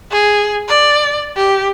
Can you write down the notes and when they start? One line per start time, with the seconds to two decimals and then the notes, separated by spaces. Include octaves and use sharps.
0.11 G#4
0.68 D5
1.36 G4